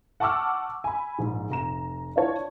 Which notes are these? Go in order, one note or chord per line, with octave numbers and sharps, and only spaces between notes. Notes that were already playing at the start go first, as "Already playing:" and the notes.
F#5 A5 C#6 D6 E6 F6
G#5 B5
A#1 G#2
F1 A#5 E7
D4 E4 F4 C5 C#5 A5